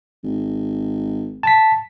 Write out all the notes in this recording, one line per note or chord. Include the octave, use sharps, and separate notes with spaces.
G#1
A5 B6